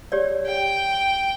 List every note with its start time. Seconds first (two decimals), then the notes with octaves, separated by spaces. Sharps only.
0.12 G4 C#5 D5
0.46 G5